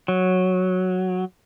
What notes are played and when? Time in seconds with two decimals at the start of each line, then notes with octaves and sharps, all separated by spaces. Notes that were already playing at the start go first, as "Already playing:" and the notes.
0.08 F#3